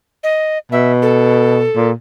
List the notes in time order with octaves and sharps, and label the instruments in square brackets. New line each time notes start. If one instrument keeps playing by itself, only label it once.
[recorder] D#5
[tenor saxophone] B2 [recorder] E5
[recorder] A4
[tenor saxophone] A#2